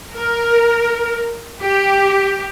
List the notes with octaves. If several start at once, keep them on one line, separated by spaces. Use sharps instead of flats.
A#4
G4